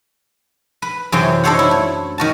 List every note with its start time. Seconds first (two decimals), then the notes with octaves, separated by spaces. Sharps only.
0.82 B4
1.12 F#2 C3 E3 B3 C5 G5
1.44 D4 D#4 A4 C5 C#5 F#5
1.59 E4
1.71 A3
2.18 D#3 F#4 A5